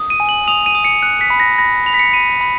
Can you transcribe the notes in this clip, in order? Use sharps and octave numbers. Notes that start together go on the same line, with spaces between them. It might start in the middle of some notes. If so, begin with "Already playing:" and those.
Already playing: D#6
D#7
G#5
F#7
D#6 F7
D#7
D#6
C#7
F#6 C#7
B6
B5
A#6
B5 A#6
B5 F7
B6
C#7
B5 D#7
B5